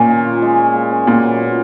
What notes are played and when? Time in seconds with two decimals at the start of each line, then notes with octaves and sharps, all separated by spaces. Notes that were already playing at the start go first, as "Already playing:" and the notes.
Already playing: A#2 C#4
0.08 D#3
0.24 F4
0.42 G#3
0.59 C#4
0.75 G#3
0.92 C#4
1.07 A#2 F#3
1.24 B3
1.40 F4